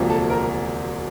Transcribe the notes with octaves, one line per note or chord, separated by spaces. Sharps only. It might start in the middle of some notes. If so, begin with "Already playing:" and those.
Already playing: E1 D2 C3 F3 A#3
A4
A#4